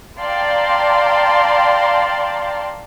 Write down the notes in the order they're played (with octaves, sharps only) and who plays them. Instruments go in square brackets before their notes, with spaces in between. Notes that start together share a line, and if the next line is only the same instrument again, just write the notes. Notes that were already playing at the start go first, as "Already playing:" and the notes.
[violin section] D5 F5 G5 A5 A#5 C6